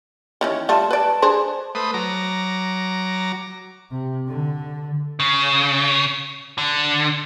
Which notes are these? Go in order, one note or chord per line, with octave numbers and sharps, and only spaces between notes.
D#3 E3 C#4
G3 A3 F4 A5
B4 D5 A5
D4 G#4 C5
A3 B4 C5 D#6
F#3 A#5 D6
C3
D3
C#3
D3